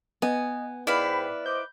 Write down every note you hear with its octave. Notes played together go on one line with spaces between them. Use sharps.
B3 D#5 G#5
G#2 E4 B4 D5 F5 G5 B5
C5 D#5 D6 G6